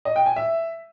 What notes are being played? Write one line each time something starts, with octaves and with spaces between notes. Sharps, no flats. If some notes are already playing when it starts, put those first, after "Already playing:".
D#5
G5
G#5
E5